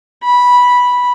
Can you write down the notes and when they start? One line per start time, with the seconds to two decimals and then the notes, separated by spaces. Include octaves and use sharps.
0.24 B5